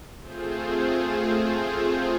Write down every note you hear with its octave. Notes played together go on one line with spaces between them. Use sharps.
A3 C4 F4 G#4 C5